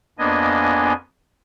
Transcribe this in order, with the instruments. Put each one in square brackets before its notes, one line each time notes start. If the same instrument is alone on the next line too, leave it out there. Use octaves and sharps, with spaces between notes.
[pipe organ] F2 A#3 B3 D4 D#5 G#5